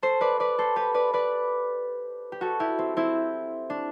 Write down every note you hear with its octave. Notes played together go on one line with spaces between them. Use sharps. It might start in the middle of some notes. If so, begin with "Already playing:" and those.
A4 C5
B4 D5
B4 D5
A4 C5
G4 B4
B4 D5
B4 D5
G4
F#4 A4
E4 G4
C4
C4 E4
D4